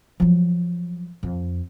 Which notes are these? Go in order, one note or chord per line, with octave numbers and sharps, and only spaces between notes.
F3 F#3
F2